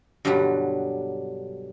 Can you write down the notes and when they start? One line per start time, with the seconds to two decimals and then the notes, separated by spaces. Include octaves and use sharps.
0.25 G2 B2 D3 F#3 G3